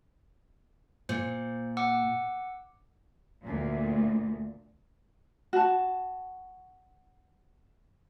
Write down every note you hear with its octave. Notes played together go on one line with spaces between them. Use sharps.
A#2 C5
F#5 D6 E6
D2 A#2
F#4 A5